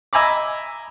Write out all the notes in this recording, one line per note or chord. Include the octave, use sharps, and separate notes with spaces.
D#5 E5 G#5 A#5 B5 D6